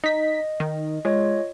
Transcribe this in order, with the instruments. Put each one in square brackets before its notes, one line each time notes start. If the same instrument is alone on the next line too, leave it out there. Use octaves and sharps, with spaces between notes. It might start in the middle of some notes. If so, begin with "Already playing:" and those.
[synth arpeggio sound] D#4 B6 [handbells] D#5
[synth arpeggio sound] D#3
[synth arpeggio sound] G#3 [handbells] F4 C#5 D#5